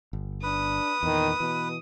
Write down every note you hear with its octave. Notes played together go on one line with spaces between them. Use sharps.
G1
D4 B4 D#6
E2 A#2 D#3
B2 E3